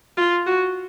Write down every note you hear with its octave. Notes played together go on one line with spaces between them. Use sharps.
F4
F#4